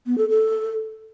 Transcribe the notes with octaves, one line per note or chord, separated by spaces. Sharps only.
B3
A4
A4